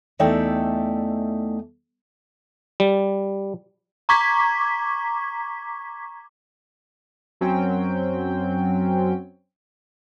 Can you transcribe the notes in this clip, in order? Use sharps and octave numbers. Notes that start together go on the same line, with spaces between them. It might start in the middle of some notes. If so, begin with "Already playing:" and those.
E2 A3 D#4 D5 E5 G5
G3
A#5 C#6 D6 G#6 B6
F#2 F#3 C4 C#4 G5